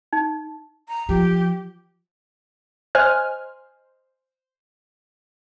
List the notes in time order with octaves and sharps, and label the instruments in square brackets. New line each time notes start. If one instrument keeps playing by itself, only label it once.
[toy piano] D#4
[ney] A#5
[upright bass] F3 [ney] G4
[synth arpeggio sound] C5 D#5 G#5 F6 F#6